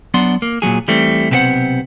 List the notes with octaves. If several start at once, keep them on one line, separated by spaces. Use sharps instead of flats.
F#3 B3 D4 F#5 C6
A#3
A#2 C#3 F#3 G#4
E3 G3 A3 C4
B1 C3 B3 G4 C5 F#5